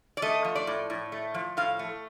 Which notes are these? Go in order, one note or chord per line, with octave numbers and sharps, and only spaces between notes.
D5
A3 D#5
F3
D5
A2
A2
A3
F3
A2 F5
A3